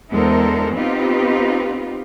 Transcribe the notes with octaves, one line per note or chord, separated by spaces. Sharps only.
E2 G#3 D4 A4 A#4 C5
B3 C4 D#4 F4 G4 B4